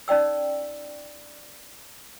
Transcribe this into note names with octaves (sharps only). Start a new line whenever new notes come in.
C#4 D#4 D5 G5 E6